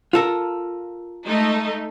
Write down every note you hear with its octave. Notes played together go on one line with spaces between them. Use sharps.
F4 A4 A#4
G#3 A3 D#4